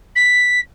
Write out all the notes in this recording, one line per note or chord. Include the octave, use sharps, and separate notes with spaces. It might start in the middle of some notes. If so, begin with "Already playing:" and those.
B6